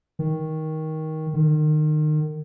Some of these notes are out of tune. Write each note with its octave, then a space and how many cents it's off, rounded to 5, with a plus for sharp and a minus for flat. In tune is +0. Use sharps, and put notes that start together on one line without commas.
D#3 +15
D#3 -30